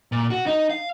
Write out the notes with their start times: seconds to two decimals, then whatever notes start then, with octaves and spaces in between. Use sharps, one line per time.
0.12 A#2
0.30 F#4
0.46 D#4
0.70 F5